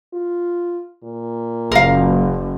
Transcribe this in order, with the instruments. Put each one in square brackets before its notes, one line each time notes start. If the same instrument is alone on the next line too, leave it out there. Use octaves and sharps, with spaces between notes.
[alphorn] F4
A#2
[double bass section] F#1 [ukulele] A#4 F5